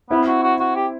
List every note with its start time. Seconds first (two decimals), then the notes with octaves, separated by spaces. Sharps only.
0.10 B3 C4 E4
0.27 F#4
0.43 F#4
0.60 F#4
0.75 G4